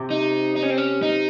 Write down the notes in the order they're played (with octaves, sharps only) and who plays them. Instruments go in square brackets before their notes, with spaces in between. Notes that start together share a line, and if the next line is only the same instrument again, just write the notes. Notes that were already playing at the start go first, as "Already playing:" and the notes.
Already playing: [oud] C3
[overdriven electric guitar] D#4
D#4
C#4
C4
C#4
D#4